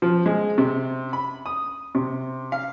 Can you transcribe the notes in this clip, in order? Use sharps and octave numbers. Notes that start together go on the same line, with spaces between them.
F3
G#3
C3
B5
D#6
C3
F5